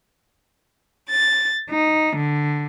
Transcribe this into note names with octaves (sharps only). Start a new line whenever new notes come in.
A6
D#4
D3